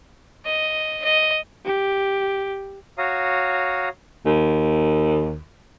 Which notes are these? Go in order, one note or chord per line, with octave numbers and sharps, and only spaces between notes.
D#5
D#5
G4
F#4 C#5 F5 A#5 D#6
D#2